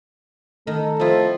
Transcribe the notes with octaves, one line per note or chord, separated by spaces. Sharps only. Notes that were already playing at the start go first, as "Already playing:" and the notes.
D#3 A3 A4
F3 C4 E4